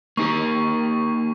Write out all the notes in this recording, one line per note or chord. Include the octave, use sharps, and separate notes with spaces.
A#3 D#4 G4 C#6